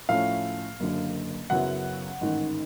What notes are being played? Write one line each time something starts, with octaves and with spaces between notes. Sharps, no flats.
A2 F3 A3 C#4 F5
F#1 F#2 D3
F#2 C#3 F#3 B3 E4 F#5
A1 G#2 D#3